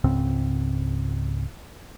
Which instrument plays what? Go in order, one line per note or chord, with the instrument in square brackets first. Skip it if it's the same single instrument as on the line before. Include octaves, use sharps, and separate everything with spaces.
[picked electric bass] C#2 G#2 C#3 C4